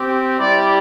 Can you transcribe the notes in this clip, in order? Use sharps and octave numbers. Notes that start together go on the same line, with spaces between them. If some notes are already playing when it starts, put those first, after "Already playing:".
Already playing: C4 G4
G3 E4 G4 D5